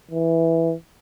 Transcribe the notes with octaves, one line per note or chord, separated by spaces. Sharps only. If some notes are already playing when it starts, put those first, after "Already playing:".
E3